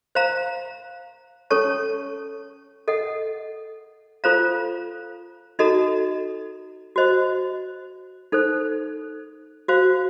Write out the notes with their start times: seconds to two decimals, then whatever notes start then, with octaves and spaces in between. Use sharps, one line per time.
0.15 C5 F5 A#5
1.50 C#4 A4 C#5 A5 C#6
2.88 A4 D#5 F#5
4.24 F4 A4 C5 F5 A#5
5.59 D#4 F#4 A4 D#5 A#5
6.96 F#4 C5 D#5
8.32 D#4 A4 C5
9.68 F#4 C5 F5